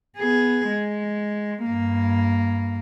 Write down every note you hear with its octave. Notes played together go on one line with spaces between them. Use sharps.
B3 G#4
G#3
G2 A#3